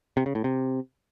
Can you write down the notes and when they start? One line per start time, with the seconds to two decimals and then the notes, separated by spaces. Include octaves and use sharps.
0.17 C3
0.26 C#3
0.35 A2
0.44 C3